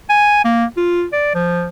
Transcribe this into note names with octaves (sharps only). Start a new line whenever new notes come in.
G#5
A#3
F4
D5
F3